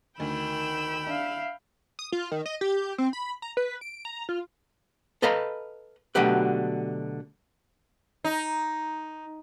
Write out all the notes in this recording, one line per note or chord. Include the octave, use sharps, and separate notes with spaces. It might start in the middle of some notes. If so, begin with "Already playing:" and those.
D2 D#3 G5 B5 E6
D4 E5 F5
D#6
F4
D#3
D#5
G4
C4
B5
A#5
B4
D7
A#5
F4
A4 B4 D#5 F5 A#5 B5
B2 D3 F#3 A3 G4 B4
D#4